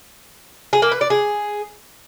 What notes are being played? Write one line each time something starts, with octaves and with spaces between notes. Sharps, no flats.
G#4
A#3
B4
D5
G#4